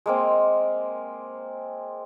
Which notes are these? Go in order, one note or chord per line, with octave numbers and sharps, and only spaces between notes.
G#3 A#3 C4